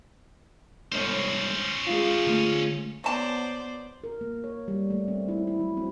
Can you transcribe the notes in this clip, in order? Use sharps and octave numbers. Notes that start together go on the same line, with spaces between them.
C2 G#2 C#4 C5 C#5
G#3 F4
D3 A3
F#3 B3 C5 D5 A5
A#4
A#3
C#5
G3
A3
C4
E4
E4
F#3
C4